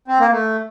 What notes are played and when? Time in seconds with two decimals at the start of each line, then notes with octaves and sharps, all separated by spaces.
0.08 C4
0.20 A#3
0.31 A3